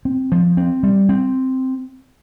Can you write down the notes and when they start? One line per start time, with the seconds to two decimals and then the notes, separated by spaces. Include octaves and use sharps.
0.05 C4
0.32 F3
0.57 C4
0.83 G3
1.09 C4